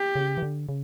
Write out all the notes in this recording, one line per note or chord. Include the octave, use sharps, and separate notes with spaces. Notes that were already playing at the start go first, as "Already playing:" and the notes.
Already playing: G4
C#3
E3
D3
C#3